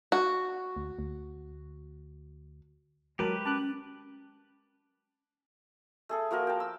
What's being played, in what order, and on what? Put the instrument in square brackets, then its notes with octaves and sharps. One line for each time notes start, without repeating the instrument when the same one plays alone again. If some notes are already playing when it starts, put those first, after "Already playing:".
[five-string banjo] F#4
[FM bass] D2
D2
[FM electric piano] F#3 A#4 A5 [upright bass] G#3 [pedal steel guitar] G4 B4
[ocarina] C#4 [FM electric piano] A5 D6 F#6
[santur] A3 G#4 A4
F3 A#3 F#4 A#4
G5 A5
E6